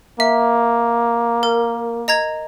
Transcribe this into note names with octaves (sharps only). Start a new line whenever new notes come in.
A#3 E5
A#4
D#5 A#5 G#6